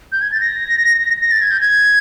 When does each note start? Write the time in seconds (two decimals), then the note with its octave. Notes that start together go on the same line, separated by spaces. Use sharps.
0.12 G6
0.22 G#6
0.32 A6
0.41 A#6
1.21 A#6
1.31 A6
1.41 G#6
1.51 G6
1.61 G#6